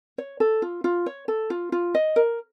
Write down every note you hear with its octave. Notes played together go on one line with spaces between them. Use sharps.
C#5
A4
F4
F4
C#5
A4
F4
F4
D#5
A#4